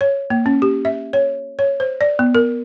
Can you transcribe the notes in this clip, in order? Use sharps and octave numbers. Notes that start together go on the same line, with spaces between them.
C#5
A#3
C#4
G4
E5
C#5
C#5
C5
D5
B3
A#4